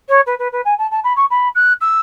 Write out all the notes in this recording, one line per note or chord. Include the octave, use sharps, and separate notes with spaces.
C#5
B4
B4
B4
G#5
A5
A5
B5
C#6
B5
F#6
E6